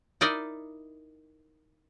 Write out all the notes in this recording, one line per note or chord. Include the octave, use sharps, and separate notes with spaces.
D#4 E4 A#4 D5 D#5